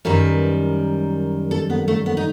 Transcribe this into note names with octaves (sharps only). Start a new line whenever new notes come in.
F#2 D#3 G3 B4
A4
B3
A3
B3
D#4